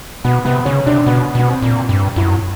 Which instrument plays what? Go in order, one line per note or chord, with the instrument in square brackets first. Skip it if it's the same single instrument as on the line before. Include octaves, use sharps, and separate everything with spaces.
[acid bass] B2 [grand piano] B3
[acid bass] C3 [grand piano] B3
[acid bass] C#3 [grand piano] C#4
[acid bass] C3 [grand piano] D4
[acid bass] B2 [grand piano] B3
[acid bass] B2 [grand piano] B3
[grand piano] C4
[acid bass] A#2
G2
[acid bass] F#2 [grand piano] E4